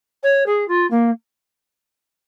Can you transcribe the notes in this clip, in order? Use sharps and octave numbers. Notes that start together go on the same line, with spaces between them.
C#5
G#4
F4
A#3